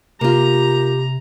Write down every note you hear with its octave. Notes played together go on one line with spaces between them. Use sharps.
C3 A#3 F4 G4 A#5